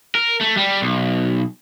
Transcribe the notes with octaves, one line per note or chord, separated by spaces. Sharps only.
A#4
A3
G3
B1